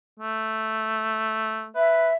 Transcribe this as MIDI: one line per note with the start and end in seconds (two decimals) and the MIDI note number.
0.20 1.70 57
1.76 2.09 71
1.76 2.14 76